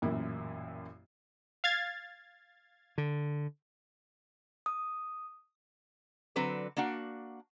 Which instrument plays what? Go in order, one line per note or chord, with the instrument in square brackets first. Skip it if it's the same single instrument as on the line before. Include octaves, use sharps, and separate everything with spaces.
[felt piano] A1 F#2 A#2 A#3 E4
[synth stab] F5 G#6 A6
[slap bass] D3
[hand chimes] D#6
[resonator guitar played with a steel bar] D3 F#3 C4 B4 D5
A#3 D4 F#4 F#5